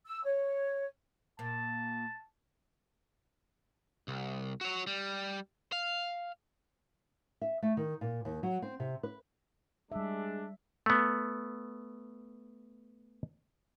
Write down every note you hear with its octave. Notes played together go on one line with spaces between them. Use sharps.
E6
C#5
A#2 A#3 A5
C2
F#4 C#5
G3
F5
E5
A3
D#3
A#2
D#2
F#3
C4
C3
B4
G3 G#3 D4 E5
A3 B3